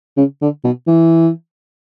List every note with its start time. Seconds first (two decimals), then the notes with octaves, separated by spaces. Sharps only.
0.17 C#3
0.41 D3
0.64 B2
0.87 E3